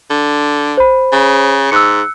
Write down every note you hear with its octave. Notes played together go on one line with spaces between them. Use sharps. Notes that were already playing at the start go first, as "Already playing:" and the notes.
D3
C5 B5
C#3
G#2 E6 F#6 C#7